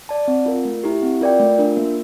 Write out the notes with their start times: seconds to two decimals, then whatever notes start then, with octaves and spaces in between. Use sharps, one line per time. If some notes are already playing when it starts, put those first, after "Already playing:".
0.09 D5 A5
0.28 C4
0.46 F4 A#4
0.65 A3
0.84 E4 G4
1.02 C4
1.21 F4 A#4 D5 G5
1.39 A3
1.59 D4 F4 A#4
1.77 A#3